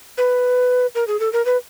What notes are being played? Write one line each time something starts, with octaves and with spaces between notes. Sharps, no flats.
B4
A#4
G#4
A4
A#4
B4